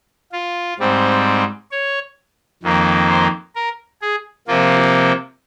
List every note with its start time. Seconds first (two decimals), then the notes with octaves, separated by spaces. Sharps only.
0.32 F4
0.79 G#2 G3 C4
1.72 C#5
2.63 F2 D#3 A#3
3.09 C5
3.55 A#4
4.02 G#4
4.48 C3 F3 A#3 F4